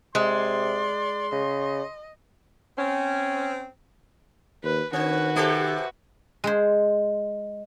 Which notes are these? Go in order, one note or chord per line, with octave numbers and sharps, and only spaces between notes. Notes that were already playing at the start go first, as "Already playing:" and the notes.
C3 G#3 D5 C6
C#3 D#5
C4 C#4
D#2 B4
D#3 C4 F#4 B4
C3 G4 A4
G#3 G#4 C5